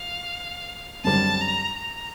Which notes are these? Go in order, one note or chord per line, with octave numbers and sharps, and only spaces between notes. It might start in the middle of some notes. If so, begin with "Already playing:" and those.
Already playing: F5
F#2 D3 G3 C4 A5
A#5
A#5